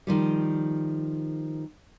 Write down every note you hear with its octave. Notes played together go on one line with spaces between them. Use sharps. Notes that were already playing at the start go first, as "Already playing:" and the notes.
D#3 F3 G3